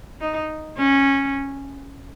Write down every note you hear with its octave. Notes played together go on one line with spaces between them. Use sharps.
D#4
C#4